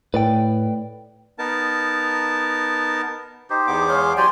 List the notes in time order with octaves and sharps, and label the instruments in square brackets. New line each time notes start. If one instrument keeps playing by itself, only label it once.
[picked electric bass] A2 [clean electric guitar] B4 D5 G5
[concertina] B3 D#4 A#4 A5
[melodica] D#4 G4 C5
[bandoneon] E2 B3 D6
[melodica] G#3 F5 C6 [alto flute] C#5
[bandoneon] F#3 G4 D5 [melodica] C5 G#5 [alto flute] C6